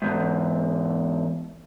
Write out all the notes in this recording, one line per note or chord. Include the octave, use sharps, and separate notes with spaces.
E2 G#2